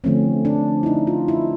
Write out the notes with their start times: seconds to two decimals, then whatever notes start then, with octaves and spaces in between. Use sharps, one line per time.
0.04 D3 F3 A3 C4 C#4
0.45 D4
0.83 E4
0.86 D#4
1.07 F4
1.28 E4